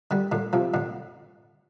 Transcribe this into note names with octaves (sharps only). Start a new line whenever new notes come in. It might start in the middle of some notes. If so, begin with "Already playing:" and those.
D3 G3
A2 D3
C3 F3
A2 D3